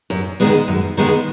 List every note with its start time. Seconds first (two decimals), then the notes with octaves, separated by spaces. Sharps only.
0.10 F#2
0.40 D#3 G#3 B3
0.68 F#2
0.97 D#3 G#3 B3